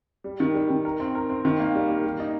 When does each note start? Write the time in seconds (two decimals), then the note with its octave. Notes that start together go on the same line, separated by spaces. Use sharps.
0.24 G3
0.40 D#3
0.54 G3
0.70 D#3
0.85 A#4
1.00 C4
1.15 A#4
1.30 C4
1.45 D#3
1.60 A#3
1.75 G3
1.89 A#3
2.04 G3
2.20 D#4